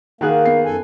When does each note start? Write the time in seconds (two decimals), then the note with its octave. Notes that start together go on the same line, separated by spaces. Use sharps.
0.21 D#3 A#3 G#4 F5 F#5 F#6
0.45 B3 C7
0.65 F#2 A4 G#5